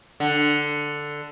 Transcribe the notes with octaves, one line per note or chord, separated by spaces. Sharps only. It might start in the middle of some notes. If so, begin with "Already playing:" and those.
D3